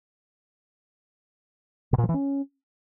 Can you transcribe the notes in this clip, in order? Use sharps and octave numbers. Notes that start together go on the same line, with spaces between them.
B2
A#2
F3
E3
C#4